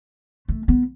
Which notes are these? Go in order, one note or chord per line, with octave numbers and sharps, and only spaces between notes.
A3
B3